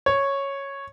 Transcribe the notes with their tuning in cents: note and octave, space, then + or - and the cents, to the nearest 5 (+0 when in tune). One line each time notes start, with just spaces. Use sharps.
C#5 -5